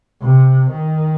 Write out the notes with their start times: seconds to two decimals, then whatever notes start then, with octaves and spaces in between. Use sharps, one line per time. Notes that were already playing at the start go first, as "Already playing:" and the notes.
0.22 C3
0.72 D#3